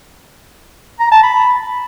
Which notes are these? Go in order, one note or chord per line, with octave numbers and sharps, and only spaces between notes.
A#5
A5
B5